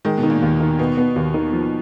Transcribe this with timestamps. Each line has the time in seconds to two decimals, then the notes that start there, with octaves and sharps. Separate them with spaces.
0.05 D#3 G#3
0.18 B2
0.23 D#3
0.30 A#2
0.42 D#2
0.61 D#3
0.79 B2 B3
0.97 B3
1.16 D#2
1.34 D#3
1.53 F3